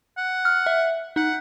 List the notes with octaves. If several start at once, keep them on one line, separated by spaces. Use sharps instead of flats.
F#5
F6
E5
D#4 F#5